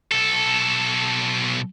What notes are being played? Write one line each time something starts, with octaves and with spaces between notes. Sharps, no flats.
B1 A4